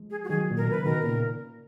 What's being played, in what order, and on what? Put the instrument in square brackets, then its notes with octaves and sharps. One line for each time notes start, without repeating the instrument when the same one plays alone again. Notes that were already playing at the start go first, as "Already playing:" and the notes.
Already playing: [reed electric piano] F3 G#3
[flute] G#4
F#4
[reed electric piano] D#3 F#3 [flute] G#4
[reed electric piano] A#2
[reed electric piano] B2 [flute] A#4
[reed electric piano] C#3 [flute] B4
[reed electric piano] B2 D#3 [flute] A#4
[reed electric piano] A#2 C#3